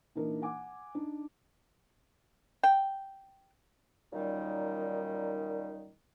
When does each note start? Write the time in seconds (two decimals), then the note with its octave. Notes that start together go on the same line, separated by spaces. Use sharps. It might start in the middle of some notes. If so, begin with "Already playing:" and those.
0.15 A#2 E3 A#3 D4 D#4 A#4
0.42 F#5 G#5 D6
0.95 D4 D#4
2.63 G5
4.13 F#2 A#2 D#3 G3 D#4